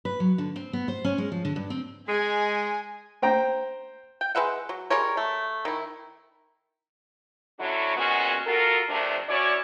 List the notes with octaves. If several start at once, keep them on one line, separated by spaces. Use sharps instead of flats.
B4
F#3
D3
C4
B3
C5
C#4
G#3
F3
D3
G2
C4
G#3 G#4 G#5
C5 G5 A#5
G5
G#3 B4 E5 F#5
F#3
G3 G#3 A#4 C#5
A3
D#3 E4
D3 F#3 C#4 E4 F#4
A#2 G#3 B3 C#4 F#4
F4 F#4 A4 A#4
G2 C3 F3 A3 D4
C#4 E4 F#4 C#5 D5